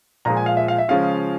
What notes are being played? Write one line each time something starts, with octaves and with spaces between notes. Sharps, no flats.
A#2 F3 G#3 A#5
G#5
F5
E5
F5
E5
C#3 F3 G#3 C#4 F4 F5